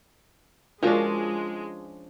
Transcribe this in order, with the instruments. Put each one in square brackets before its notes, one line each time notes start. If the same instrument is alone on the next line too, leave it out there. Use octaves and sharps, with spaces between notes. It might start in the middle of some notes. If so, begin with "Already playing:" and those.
[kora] F3 C#4 D4 [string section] G#3 [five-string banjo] F4 F#4 A#4